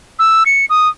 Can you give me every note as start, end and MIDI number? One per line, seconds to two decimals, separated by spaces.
0.19 0.43 88
0.46 0.65 97
0.70 0.88 87